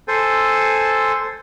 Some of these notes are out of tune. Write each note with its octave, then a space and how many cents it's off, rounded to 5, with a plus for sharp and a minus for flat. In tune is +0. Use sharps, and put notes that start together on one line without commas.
A4 +0 C5 +0 G#5 -10